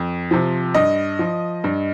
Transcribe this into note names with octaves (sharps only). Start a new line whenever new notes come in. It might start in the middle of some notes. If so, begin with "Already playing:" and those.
Already playing: F2
C3 F3
G2 D#5
F3
G2